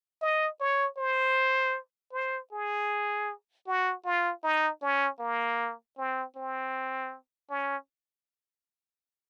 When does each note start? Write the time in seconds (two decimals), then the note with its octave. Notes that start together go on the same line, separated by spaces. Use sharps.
0.21 D#5
0.60 C#5
0.98 C5
2.13 C5
2.52 G#4
3.67 F#4
4.05 F4
4.44 D#4
4.82 C#4
5.20 A#3
5.98 C4
6.36 C4
7.50 C#4